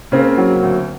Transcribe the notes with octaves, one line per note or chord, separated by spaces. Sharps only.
C#3 A#3 C4
F#3
D2